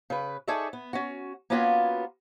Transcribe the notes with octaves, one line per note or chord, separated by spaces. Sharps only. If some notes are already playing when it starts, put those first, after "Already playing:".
C#3 B4
D#4 G#4 A4 C#5 D5 E5
B3
C#4 F#4
A#3 B3 C#4 F4 F#4 B4